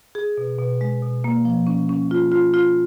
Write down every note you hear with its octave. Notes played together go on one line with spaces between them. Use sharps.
G#4
B2
B2
G#3
B2
A#3
F3
C#4
C#4
F4
F4
F4